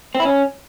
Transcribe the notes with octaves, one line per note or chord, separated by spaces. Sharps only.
C4
E4
C#4